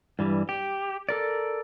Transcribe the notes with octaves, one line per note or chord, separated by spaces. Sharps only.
G2 E3 G3
G4
A4 A#4 D5